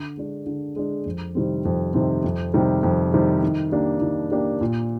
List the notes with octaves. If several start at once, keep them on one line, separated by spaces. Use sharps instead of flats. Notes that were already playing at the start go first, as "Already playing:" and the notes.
Already playing: D3
G#3 D4
D3
G#3 D4
F2
C3 D#3 G3 C4
F2
C3 D#3 G3 C4
F2
C3 D#3 G3
F2
C3 D#3 G3
D#3
A#3 D4 G4
D#3
A#3 D4 G4
A#2